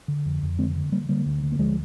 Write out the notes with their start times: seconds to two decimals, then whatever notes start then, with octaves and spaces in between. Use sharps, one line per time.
0.08 D3
0.26 F2
0.43 F2
0.58 D3 G#3 C4
0.75 D3
0.92 D3 G3 A#3
1.09 D3 G3 A#3
1.26 D2
1.43 D3
1.52 A#3
1.59 D2 F3 G#3